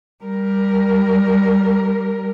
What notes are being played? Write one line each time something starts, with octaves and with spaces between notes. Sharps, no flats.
G3 A#4